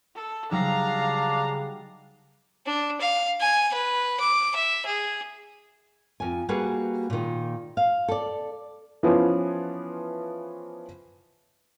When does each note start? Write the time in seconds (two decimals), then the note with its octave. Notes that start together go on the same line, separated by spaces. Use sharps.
0.15 A4
0.51 C#3 F#3 G3 D4 D#4 F5 A#5
2.66 D4
3.01 F5
3.41 G#5
3.73 B4
4.20 D6
4.55 E5
4.86 G#4
6.20 F2 G#5
6.49 G3 A#3 F#4 G#4 B4
7.10 A#2 D#3
7.77 F5
8.08 A4 D5
9.03 E3 F3 B3 C#4 F4